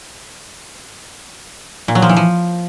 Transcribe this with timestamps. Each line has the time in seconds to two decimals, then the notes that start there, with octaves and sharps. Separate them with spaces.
1.88 A#2
1.95 F#3
2.02 F3
2.09 E3
2.16 F3